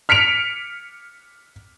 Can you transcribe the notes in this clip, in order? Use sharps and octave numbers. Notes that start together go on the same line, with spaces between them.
F6 B6 C#7 D7 F7